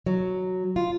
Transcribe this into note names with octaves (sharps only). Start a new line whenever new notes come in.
F#3
F4